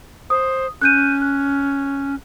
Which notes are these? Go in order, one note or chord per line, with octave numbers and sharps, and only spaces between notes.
C5 D#6
C#4 F#6 G6 D#7
F#6